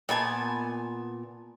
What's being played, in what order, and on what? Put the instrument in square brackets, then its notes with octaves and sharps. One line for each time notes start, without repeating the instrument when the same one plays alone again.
[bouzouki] A#2 B3 G#5 A5